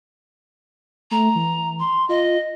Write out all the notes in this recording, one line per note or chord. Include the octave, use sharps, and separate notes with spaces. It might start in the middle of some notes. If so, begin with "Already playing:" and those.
A3 A#5
E3
C6
F4 D#5